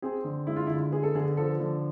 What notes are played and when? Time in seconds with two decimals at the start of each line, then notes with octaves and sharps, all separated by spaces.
0.02 C4 G#4
0.24 D3
0.47 G#3 E4
0.56 F4
0.67 E4
0.70 D3
0.92 B3 G#4
1.03 A4
1.15 D3 G#4
1.37 F3 A4
1.60 D3